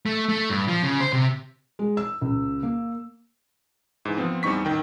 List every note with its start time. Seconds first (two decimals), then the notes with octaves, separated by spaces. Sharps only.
0.06 A3
0.29 A3
0.50 G2
0.68 F3
0.83 C#3
1.00 C5
1.13 C3
1.79 G#3
1.97 E6
2.21 C#2
2.63 A#3
4.05 G#2 E3
4.17 F3 B3 C4
4.43 E2 G3 C4 D#4 C#6 B6
4.65 A1 D#3 G5